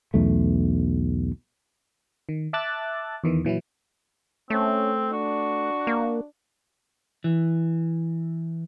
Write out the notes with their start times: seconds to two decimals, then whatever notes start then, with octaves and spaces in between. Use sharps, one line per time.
0.14 B1 E2 A3
2.29 D#3
2.53 E5 A5 D6 E6 F#6 A6
3.24 E2 D#3 E3
3.45 A#2 E3 F#3 E4
4.50 A3 C4 C#4
5.12 D4 F#4
5.87 A#3
7.24 E3